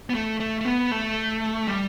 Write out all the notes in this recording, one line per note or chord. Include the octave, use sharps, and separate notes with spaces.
B3
A3
A3
A3
B3
A3
G3